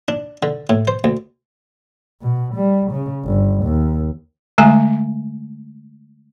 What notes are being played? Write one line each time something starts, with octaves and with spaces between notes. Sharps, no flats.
D4
D3
A2
C5
D2
B2
G3
C#3
G1
D#2
D3 G#3 A3 G#5